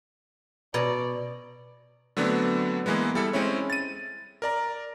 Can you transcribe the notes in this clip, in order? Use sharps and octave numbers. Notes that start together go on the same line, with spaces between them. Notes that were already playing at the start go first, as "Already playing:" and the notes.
B2 C#5 D5 A#5
D3 F#3 A3 B3 C4 D4
E3 G#3 A#3 B3
G3 E4 A4 C#7
G#3 C4 C#4 E4 C#5
A6 D#7
A#4 D5 A#5